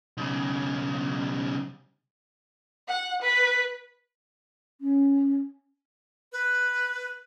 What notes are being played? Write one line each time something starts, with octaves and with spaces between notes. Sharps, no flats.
B1 C#3
F#5
B4
C#4
B4